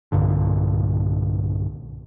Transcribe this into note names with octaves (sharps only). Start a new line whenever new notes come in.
B1 G2 A#2 D3